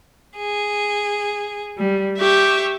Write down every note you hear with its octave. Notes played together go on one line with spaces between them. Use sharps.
G#4
G3
G4 E5 C#6